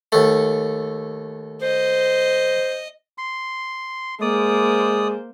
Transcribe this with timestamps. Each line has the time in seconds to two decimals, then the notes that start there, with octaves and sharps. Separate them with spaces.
0.12 D#2 A3
1.62 C5 D#5
3.18 C6
4.21 G#3 A#3 C5 D5 D#6